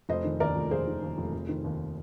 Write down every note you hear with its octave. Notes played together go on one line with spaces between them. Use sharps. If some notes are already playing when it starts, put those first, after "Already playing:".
F1 C5 D#5
D#3
D#2 A#4 D5
F1
F1 G#4 C5
D#3
D#2
F1
F1
D#3
D#2